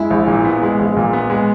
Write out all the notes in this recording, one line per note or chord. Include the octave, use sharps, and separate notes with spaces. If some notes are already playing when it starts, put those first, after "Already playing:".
Already playing: G#3 E4
A#1
A#2
B3
G#3
A#1
A#2
B3
G#3